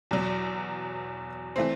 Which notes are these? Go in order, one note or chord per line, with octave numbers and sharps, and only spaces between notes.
E2 B2 F#3
E3 A3 C4